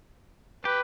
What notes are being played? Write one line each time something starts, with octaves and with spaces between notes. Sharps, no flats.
G4 B4